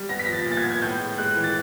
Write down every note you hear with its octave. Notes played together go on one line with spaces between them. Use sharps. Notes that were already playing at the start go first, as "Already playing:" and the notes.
Already playing: G3
B3 A#6
B6
F3 A#6
A6
A#2
A6
G#6
B3
G#6
A2 G6
G#3
G#3 F#6
E3
A6